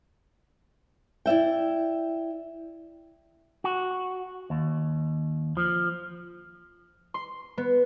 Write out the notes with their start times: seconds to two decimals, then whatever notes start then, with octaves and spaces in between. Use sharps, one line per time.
1.26 E4 D5 E5 G5
3.64 F#4
4.50 D#2
5.57 F3
7.14 C6
7.58 B3